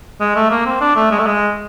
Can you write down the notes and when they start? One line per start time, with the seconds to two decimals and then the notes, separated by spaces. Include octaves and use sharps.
0.21 G#3
0.36 A3
0.51 A#3
0.66 C4
0.81 D4
0.96 A3
1.11 G#3
1.19 A3
1.27 G#3